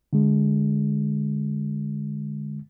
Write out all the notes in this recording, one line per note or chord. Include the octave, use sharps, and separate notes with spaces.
D3 G#3